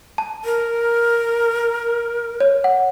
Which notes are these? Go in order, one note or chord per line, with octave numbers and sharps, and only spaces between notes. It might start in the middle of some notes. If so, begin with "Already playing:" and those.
A5
A#4
C#5
F#5